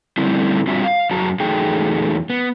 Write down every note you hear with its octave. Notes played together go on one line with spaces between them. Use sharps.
D3 G3 A3 C4 D4 E4
G3 C4 D4 F4 F#4 E5
F5
F#2 F#3 F#4 A5 A#5
E2 F#3 A3 D#4 G#4 G5
B3